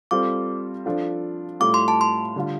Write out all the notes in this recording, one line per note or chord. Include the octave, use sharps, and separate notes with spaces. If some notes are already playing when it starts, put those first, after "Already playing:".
G3 C4 F4 A4 D6
F3 D4 F4 A4
A2 G3 F4 A4 D6
C6
A5
C6
D3 G3 F4